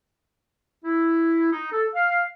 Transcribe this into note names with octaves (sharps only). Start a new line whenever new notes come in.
E4
D#4
A4
F5